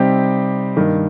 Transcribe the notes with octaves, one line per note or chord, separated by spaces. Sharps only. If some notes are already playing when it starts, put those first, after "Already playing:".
Already playing: C3 G3 C4 D#4 G4
G2 D#3 A#3